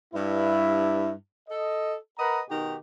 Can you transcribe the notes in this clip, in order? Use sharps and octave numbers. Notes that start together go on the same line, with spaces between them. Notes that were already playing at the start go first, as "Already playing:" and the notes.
G2 E4
A4 D#5
A#4 B4 D#5 F#5 A#5 B5
B2 D#3 D#4 F#4 G4